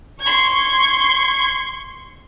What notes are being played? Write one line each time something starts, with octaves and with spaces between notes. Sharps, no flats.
C6 C#6 G#6